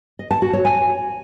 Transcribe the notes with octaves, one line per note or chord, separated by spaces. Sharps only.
D#5
A5
F#4
C#5
G#5